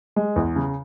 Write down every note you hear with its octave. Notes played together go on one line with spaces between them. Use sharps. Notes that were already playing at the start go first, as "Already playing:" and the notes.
G#3
E2
C#3